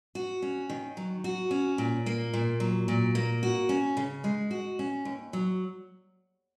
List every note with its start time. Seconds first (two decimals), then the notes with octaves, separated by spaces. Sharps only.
0.15 F#4
0.42 C#4
0.70 D#3
0.97 F#3
1.24 F#4
1.51 C#4
1.78 A#2
2.06 A#3
2.33 A#2
2.60 F#3
2.88 A#2
3.15 A#3
3.43 F#4
3.69 C#4
3.97 C#3
4.24 G#3
4.51 F#4
4.79 C#4
5.05 D#2
5.33 F#3